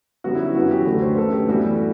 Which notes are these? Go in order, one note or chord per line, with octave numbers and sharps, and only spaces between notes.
F#2 D3 G3 B3 F#4
E4
E4
F#2 E3 B3 F#4
G4
D2 D3 A3 B4
C5
F#2 D3 A3 A4
G4
A2 E3 G3 B3 F#4